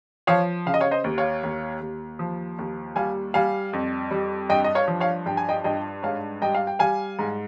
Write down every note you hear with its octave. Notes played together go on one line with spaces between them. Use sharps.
F3 C#5 F5
C#3 F5
D#5
C#5 F5
C5 D#5
D#2
C#5 F5
D#2
D#2
F3
D#2
G3 F5 G#5
G3 F5 G#5
F2
G3
G2 D#5 G5
D#5
C#5 F5
F3
C#5 F5
G2 G5
G#5
D#5 G5
G2 D#5 G5
G#2 C#5 F5
G3 D#5 G5
F5
G5
G3 F5 G#5
G#2